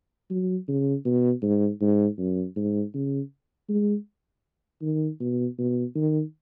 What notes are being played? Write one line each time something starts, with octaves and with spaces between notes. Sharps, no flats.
F#3
C#3
B2
G#2
G#2
F#2
G#2
C#3
G#3
D#3
B2
B2
D#3